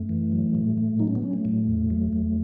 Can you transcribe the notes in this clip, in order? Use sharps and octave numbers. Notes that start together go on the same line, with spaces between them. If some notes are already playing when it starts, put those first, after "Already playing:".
Already playing: F#2 A3
E3
F#3
A2
A2
F#3 D#4
C#4
B3
F#3 C#4
A3
A2
E2
F#3
E2